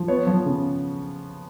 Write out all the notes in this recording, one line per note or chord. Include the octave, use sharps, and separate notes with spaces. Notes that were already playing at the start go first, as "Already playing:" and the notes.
Already playing: F3
B3 C#5
F3
C#3